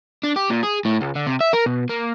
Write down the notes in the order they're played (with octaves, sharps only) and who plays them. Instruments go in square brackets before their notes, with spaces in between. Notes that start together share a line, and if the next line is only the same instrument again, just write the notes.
[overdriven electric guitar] D4
G4
A#2
G#4
A2
C#2
D3
C3
E5
A#4
B2
A#3